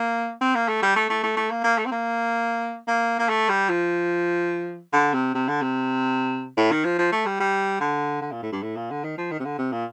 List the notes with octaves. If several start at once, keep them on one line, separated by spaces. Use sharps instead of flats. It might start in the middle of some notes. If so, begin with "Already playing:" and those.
Already playing: A#3
C4
A#3
A3
G3
A3
A3
A3
A3
A#3
A#3
A3
C4
A#3
A#3
A#3
A3
G3
F3
D3
C3
C3
D3
C3
A2
D#3
F3
F3
A3
G3
G3
D3
D3
A#2
A2
G2
A2
A#2
D3
D#3
F3
D#3
C3
D3
C3
A#2